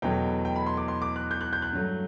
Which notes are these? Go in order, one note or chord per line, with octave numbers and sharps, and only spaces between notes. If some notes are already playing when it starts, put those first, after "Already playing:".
E2 B2 F#3 A3 G5
G5
B5
C6
D6
C6
D6
F#6
G6
F#6
G6
F#6
G2 F#3 A3